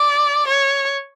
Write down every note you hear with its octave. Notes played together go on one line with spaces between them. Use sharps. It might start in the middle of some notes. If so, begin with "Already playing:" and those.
Already playing: D5
C#5